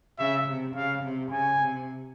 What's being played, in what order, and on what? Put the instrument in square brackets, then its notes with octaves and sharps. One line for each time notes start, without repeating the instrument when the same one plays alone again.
[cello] C#3 [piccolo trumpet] E5
[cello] C3
[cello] C#3 [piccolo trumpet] F5
[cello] C3
[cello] C#3 [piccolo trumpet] G#5
[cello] C3